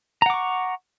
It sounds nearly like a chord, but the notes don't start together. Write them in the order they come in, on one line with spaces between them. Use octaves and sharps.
A#5 F#5 D6 C#6